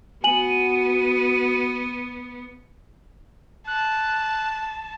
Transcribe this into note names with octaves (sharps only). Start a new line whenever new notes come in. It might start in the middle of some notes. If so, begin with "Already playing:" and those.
B3 F#4 G#5 D#7 F#7
A5 F#6